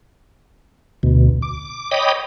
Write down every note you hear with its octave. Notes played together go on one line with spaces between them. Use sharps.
D2 B2
D6
C#5 D#5 G5 B5 D6 D#6